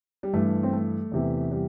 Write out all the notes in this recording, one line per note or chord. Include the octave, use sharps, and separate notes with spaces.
G3
G2 E3 A3
C4
A3
E2 C3 E3
G3